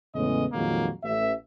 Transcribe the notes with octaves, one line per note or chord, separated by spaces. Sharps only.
E2 A2 C#3 G#3 C#4 D#5
F2 A#2 D#3 F#3 G#3 A#3
A1 E5